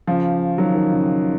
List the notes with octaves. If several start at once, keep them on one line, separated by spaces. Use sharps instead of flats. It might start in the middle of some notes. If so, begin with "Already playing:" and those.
C#3 F3
D#3 F#3
D#3
C#3